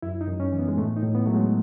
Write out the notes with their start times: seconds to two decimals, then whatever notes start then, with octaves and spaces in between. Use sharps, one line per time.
0.02 F#2 E4
0.21 D#4
0.28 F#2
0.40 C#4
0.52 E3
0.59 B3
0.68 G#3
0.77 A2 A3
0.96 D#4
1.02 A2
1.15 B3
1.26 F#3 A3
1.34 G#3